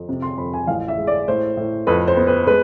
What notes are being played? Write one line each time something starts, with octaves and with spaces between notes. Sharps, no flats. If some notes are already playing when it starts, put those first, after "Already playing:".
Already playing: F2
C3
C6
F2 B5
G#5
A1 F5
E5
G#3
D5
A2 C5
A2
F2 B4
C5
B3
B4
G#3 B4